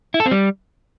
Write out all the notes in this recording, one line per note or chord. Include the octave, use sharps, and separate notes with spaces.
E4
A4
C4
G3